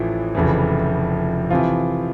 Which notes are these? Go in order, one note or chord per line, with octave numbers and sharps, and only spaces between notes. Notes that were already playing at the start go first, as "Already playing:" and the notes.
Already playing: A1 A2 E3 F3
F1 F2 C#3 E3
C3 E3 F3 F4